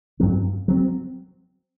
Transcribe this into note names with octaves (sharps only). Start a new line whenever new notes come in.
G2 F#3 C4
F#3 C4